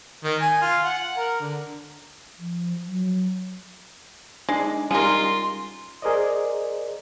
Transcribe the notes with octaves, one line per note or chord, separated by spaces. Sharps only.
D#3
G#5
F4
F#5
A#4
D3
F3
F#3
G#3 D4 D#4
G3 C#4 D#4 F4 G#4 A#4 C6
G#4 A#4 C5 D5 D#5